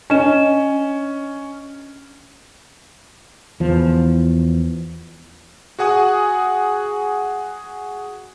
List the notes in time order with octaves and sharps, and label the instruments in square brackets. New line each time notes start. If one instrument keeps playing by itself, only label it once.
[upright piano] C#4 [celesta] D4 D#5 E7
[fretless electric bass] E2 F3
[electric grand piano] F#4 G#4 F#5 G#5 D#6